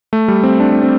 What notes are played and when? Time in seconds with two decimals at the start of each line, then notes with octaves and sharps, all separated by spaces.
0.13 A3
0.28 G3
0.43 C4
0.60 D4
0.83 C4